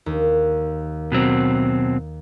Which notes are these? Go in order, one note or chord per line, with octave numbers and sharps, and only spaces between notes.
D#2
B2 F#3 C4